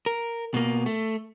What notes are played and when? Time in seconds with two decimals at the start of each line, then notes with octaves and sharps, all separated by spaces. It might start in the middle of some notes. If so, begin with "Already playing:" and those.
0.06 A#4
0.54 B2 A#3
0.86 A3